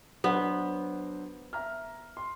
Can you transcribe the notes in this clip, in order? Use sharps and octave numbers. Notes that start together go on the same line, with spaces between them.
F#3 B3 D4 C5
E5 A#5 F6
C6